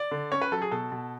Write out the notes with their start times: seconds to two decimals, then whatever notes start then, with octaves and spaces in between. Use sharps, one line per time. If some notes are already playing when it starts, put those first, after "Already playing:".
Already playing: D5
0.11 D3
0.32 C#4 C#5
0.42 B4
0.52 F#3 A4
0.62 G#4
0.71 B2 A4
0.92 B2